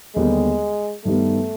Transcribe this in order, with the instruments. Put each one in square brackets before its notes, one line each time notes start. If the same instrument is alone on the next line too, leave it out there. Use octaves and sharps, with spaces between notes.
[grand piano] D#2 D3 G3 B3 [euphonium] G#3
[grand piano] G2 D#3 G3 B3 [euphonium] A3